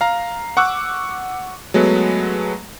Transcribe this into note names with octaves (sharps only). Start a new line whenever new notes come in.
F5 A#5
F#5 C#6 D6 E6 F#6
F#3 G#3 A3 B3